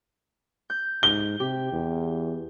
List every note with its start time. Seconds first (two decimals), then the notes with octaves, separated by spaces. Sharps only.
0.70 G6
1.03 G#2 G7
1.40 C3 G4
1.72 E2